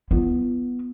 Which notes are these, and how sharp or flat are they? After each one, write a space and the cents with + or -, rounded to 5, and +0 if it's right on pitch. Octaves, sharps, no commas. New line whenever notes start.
B3 +0 F4 -35